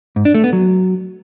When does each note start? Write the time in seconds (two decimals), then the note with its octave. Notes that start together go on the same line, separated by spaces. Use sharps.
0.16 G#2
0.25 D4
0.34 A3
0.44 B3
0.53 F#3